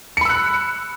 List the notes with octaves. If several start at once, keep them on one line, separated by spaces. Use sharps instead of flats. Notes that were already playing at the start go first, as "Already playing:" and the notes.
B5 E6 F#6 C#7